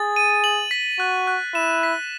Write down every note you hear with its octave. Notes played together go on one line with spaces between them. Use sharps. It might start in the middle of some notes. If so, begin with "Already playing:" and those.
Already playing: G#4 A6
D#7
F#7
B6
F#4 F#6
F#6
E4 E7
B6